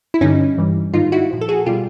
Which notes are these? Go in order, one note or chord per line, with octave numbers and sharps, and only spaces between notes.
E4
G2 D3 G3 C#4 D#4
G2 E3 G3
G#2 D#3 G3 D#4 F4
E4 F#4
A#2 F3
A4
F#4 G#4
B2 G3 F4 G4